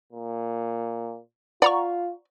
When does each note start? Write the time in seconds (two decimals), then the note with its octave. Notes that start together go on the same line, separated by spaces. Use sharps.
0.13 A#2
1.62 F4 D5 F#5 A#5 C#6